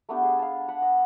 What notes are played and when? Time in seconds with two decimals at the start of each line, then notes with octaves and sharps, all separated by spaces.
0.09 A3 B3 D4 G4
0.23 G#4
0.39 F5 A5
0.68 F#5 B5
0.82 D#5